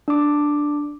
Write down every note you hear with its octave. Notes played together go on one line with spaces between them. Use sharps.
D4 D6